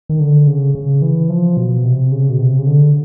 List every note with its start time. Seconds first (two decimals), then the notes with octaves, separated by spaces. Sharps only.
0.09 D#3
0.20 D3
0.47 C#3
0.75 C#3
1.02 E3
1.29 F3
1.57 B2
1.84 C3
2.12 C#3
2.29 B2
2.39 C3
2.58 C#3
2.67 D3